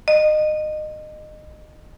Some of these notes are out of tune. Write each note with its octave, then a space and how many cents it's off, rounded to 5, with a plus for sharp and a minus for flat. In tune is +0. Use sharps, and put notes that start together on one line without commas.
D#5 -25